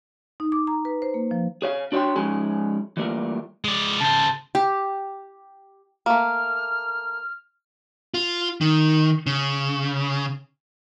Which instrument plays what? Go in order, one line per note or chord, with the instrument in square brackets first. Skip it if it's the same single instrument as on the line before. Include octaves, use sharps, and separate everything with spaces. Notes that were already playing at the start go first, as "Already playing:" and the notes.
[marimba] D#4
D6
A#5
B4
C5
A#3
F3
[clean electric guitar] G#4 C#5 F5
D4 F#4 C#5 D5 G5 C6
F3 G#3 C#4 D#4 G#4 G#5
E3 G3 A3 A#3 F4
[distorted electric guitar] G#3 D5
[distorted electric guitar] C#3 C5 [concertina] A5
[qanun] G4
[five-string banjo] A3 A#3 [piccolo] F6
[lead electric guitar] F4
D#3
C#3